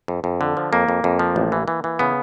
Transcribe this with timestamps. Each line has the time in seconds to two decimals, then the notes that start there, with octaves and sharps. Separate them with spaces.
0.08 F2
0.24 F2
0.41 D3
0.57 F3
0.73 F2 A#3
0.89 F2
1.04 F2
1.19 F3
1.36 A1
1.52 E3
1.68 E3
1.84 E3
1.99 C#3 B3